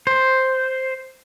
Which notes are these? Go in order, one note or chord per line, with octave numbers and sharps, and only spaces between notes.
C5